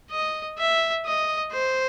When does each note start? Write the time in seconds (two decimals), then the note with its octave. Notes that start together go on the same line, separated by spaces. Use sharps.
0.11 D#5
0.59 E5
1.06 D#5
1.53 C5